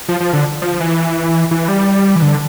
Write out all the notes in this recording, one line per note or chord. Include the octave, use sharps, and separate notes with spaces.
F3
F3
D3
F3
E3
E3
G3
E3
D3